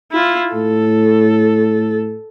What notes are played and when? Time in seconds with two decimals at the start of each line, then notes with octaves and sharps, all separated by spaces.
0.12 E4 F4
0.54 A2 A4